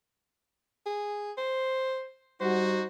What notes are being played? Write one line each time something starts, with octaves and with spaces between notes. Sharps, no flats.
G#4
C5
G3 D#4 F#4 C5